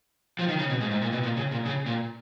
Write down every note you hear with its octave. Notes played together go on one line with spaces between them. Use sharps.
F3
D#3
C#3
B2
G#2
G#2
A#2
B2
A#2
C#3
A#2
C#3
A#2